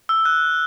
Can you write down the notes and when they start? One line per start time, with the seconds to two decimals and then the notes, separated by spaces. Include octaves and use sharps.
0.09 E6
0.25 F#6